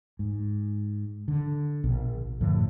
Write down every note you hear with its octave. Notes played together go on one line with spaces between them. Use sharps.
G#2
D3
A#1 B2
F#2 A2 D3 F3